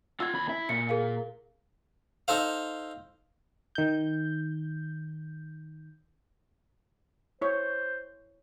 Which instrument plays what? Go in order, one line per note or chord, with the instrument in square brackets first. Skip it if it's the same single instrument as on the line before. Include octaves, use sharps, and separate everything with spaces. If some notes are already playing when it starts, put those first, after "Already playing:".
[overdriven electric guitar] F4 F#5 [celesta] E6 G#6
[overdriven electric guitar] D#2 B5
E4
[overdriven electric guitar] A#2 [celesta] C#7
[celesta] G#4 A#4 F5
[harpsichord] D#4 A4 C5 F5
[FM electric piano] D#3 G6
[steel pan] E4 C#5 [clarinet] C5